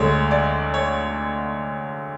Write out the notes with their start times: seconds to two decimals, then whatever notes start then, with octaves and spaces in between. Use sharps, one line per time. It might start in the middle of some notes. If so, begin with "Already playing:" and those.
Already playing: D2 D3 G#3 C#5
0.31 D5
0.74 C#5